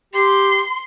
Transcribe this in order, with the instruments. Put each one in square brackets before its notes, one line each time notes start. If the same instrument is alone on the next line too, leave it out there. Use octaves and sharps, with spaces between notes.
[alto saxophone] G4 [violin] C6